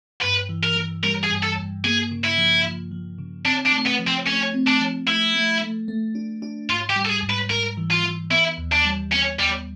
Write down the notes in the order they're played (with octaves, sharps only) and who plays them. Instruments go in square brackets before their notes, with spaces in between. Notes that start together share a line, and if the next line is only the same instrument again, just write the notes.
[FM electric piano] G2 [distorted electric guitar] B4
[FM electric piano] E3
[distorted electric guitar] A#4
[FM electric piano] E3
[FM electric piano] G3 [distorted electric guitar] A#4
[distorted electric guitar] G#4
[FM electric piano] G2
[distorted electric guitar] A4
[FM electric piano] G2
[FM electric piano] A#3 [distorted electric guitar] G#4
[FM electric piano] C#3
[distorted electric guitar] E4
[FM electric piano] F3
F3
F3
C#3
[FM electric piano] C4 [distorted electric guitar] D4
[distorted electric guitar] D4
[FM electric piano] A3
[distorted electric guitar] B3
[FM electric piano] F3
[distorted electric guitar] C4
[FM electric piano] A3 [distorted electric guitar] C#4
[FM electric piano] C4
[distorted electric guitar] D4
[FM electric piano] F3
[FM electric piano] A3 [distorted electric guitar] E4
[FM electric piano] A3
A3
A3
D4
D4
[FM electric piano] G#2 [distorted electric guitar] F4
[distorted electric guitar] G4
[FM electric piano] G3
[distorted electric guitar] A4
G#4
[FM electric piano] G#2
[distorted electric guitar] B4
[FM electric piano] G#2 [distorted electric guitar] A#4
[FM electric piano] E3
[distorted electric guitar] F4
[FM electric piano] E3
[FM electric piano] B3 [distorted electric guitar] E4
[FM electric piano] D#2
[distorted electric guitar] D4
[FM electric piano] G3
[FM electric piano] B3 [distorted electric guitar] C#4
[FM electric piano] D#2 [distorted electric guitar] G3